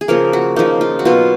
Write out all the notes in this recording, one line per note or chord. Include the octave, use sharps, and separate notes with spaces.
G#4
C#3 F3 A#3 A#4
F#4
C#3 F3 A#3 D#4
F4
F#4
B2 F#3 B3 F4